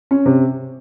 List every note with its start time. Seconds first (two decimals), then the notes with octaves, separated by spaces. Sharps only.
0.11 C#4
0.26 C3